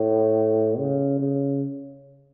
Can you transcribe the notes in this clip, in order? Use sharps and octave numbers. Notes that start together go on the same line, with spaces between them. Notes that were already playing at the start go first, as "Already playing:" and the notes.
Already playing: A2
C#3
C#3